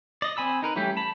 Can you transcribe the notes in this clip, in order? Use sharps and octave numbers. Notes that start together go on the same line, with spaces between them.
D5 D#5
C4 G#5 B5 E6
D#4 A#4 B4
E3 G3 A3 C#4 G4
A5 B5